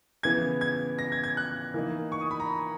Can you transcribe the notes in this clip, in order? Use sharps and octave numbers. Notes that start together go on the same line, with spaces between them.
C#3 E3 B3 G#6
G#6
A#6
G#6
G#6
F#6
E3 A#3 D#4
C#6
D#6
B5
A#5